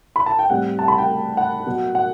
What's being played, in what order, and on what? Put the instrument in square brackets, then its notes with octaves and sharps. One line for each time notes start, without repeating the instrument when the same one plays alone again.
[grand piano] B5
A5
G5
A2 G3 C4 F#5
A5
B5
G5
F#5
B2 F#3 B3
F#5